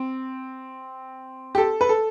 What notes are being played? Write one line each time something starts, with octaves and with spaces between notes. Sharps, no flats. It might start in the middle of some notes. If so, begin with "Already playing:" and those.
Already playing: C4
G4
A4
B4
A4